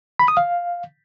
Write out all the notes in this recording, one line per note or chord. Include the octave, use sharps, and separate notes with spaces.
B5
D#6
F5